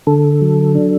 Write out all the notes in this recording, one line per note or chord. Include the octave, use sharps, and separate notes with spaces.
D3 A4
F#3
D4